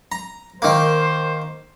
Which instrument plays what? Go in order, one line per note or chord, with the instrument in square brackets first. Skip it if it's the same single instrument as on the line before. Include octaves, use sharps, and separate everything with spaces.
[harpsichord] A#5
[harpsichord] D#3 A#3 [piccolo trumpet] C5